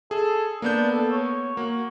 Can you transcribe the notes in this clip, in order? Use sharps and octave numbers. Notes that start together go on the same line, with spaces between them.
G#4 A4
A#3 B3 D4 G6
A4
C#5
A#3 F#4